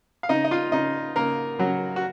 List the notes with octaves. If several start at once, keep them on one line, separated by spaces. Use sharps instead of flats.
F5
C#3 D#4 D#5
D#5
F4 F5
C#3 D#4 D#5
C#3 A#3 A#4
C#3 F#3 F#4
F#4